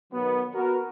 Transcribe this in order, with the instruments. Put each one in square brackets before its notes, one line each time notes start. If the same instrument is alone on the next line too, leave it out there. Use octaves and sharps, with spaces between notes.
[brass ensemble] B2 D#3 F#3 B3
B3 F#4 A#4